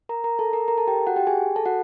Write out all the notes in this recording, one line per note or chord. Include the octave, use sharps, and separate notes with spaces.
A#4 A#5
A#4 A#5
A4 A5
A#4 A#5
A#4 A#5
A4 A5
G4 G5
F#4 F#5
G4 G5
G#4 G#5
A4 A5
F#4 F#5